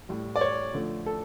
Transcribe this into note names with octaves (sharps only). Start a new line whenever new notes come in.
A2 G3
D5
C#5
D3 F3 A3
A4